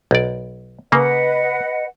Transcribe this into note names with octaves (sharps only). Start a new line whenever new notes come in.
B1 D5
C#3 A#3 B4 D#5 F#5